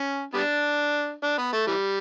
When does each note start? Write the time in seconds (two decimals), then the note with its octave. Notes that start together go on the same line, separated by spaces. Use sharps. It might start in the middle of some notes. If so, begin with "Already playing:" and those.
Already playing: C#4
0.34 G3 B3 D4
1.23 D4
1.38 B3
1.53 A3
1.67 E3 G3